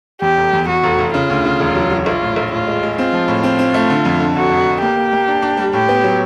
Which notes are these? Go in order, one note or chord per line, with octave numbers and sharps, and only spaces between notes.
E2 G4
F1
E2
E2 F#4
F1
F1
C#3 F4
D2
C#3
E1
F#3
F#3
A#1 F4
A2
A#1
A2 F4
G#3
G#3
C4 F4
F3
A2
C4 F4
C4
A3
D3
F2
D3
F1 F#4
F1
F1
A#3 G4
A#3
A#3
D4
D4
G3
A2 G4
B3
F#3